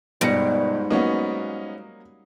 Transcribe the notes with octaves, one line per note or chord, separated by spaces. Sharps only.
G1 G#2 B2 G3 A#6 C#7
F#3 A#3 B3 C#4 D#4